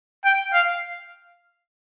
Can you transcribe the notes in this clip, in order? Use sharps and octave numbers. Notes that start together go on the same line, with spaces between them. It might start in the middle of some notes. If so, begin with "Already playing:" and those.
G5
F5